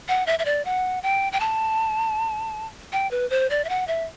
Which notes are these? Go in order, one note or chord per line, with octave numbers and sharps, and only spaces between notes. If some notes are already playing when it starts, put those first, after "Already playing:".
F#5
E5
E5
D5
F#5
G5
G5
A5
G5
B4
C5
D5
E5
F#5
E5